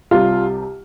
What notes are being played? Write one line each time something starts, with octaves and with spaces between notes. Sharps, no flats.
C2 C3 G3 F4